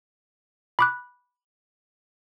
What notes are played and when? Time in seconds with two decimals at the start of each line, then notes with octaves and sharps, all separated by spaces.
0.79 B5 D6 F#6